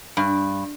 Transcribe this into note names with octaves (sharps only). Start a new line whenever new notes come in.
G2